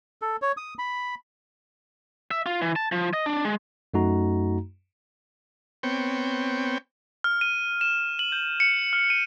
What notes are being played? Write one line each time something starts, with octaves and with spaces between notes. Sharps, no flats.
A4
C#5
D#6
B5
E5
F4
E3
A5
F3
D#5
D4
G#3
F#2 A3 D#4 F#4 A#5
B3 C4 C#5 G5
F6
D#7
E7
F#7
G6
C#7
F6
D#7